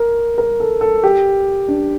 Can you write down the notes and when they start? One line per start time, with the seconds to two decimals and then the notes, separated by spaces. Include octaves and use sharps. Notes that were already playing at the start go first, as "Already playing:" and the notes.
Already playing: A#4
0.38 A#4
0.60 A4
0.81 A4
1.04 G4
1.68 D4